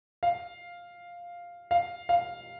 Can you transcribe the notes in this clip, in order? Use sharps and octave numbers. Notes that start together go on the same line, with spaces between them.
F5
F5
F5